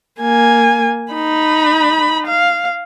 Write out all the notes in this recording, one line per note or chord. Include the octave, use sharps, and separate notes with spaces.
A#3 G#5
D#4 B5
F5